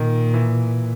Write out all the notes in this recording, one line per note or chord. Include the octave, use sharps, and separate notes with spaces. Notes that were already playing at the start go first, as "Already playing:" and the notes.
Already playing: A#2 D#3
E3